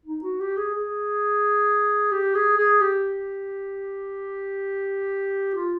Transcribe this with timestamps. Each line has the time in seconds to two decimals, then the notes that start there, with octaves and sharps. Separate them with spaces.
0.06 D#4
0.23 F#4
0.40 G4
0.57 G#4
0.74 G#4
2.12 G4
2.35 G#4
2.58 G#4
2.81 G4
5.55 F4